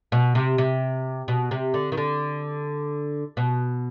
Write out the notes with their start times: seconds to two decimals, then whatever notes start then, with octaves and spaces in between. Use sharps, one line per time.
0.12 B2
0.35 C3
0.58 C3
1.28 B2
1.51 C3
1.74 D3
1.92 D#3
1.97 D3
3.37 B2